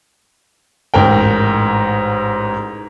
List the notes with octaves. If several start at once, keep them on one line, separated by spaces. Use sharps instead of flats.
A1 G#2 A#4 G5